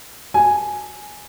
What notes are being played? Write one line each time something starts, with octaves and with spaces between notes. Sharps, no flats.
G#5